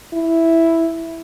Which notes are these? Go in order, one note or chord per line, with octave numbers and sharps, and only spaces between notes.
E4